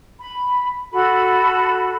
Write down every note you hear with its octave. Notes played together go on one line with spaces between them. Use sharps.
B5
F#4 A4 B5